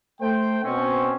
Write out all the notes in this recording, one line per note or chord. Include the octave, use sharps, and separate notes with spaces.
A3 C5 G5
B2 C4 C#4